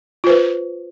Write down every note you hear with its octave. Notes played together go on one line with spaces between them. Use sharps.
F4 B4 C5